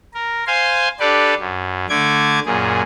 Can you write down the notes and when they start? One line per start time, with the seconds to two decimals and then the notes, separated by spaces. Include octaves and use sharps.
0.14 A#4
0.47 C5 F5 G#5 C6
1.00 D4 G4 A4 B4 D5
1.40 F#2
1.89 D3 A3 D6 G#6
2.46 F#2 A#2 G#4